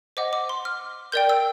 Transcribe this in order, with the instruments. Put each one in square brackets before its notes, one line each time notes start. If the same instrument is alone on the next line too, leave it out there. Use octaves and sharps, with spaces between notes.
[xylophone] C5 D#5 F#5 D6
D6
C6
F6
A#4 D5 G5 G6
E6